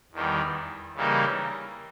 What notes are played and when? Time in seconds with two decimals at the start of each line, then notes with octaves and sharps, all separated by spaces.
0.12 E2 D#3 G3
0.95 C#3 E3 G3 A#3 D#4